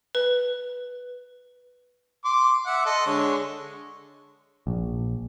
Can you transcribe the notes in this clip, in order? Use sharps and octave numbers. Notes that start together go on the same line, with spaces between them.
B4
C6 D6
E5 F#5 D6
A4 D#5 C6
D3 G#3 C#5
A#1